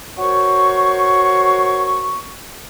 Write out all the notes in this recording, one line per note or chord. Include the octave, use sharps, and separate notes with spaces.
F#4 A#4 C5 C#5 C#6